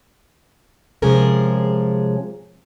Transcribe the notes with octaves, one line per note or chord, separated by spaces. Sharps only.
C3 F3 G#3 C#4 G#4 A#4